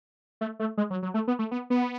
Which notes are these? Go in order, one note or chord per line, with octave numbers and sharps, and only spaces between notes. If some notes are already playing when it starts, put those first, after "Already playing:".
A3
A3
G#3
F#3
F#3
A3
B3
A3
B3
B3